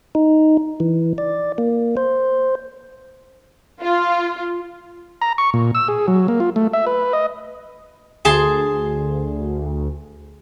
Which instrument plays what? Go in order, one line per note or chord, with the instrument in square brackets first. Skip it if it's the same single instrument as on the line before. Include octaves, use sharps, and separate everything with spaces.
[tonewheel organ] D#4
E3
D5
A#3
C5
[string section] F4
[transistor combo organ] A#5
C#6
A#2
E6
G#4
F#3
A#3
F4
A3
E5
B4
D#5
[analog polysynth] D2 [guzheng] G#4 A5 C6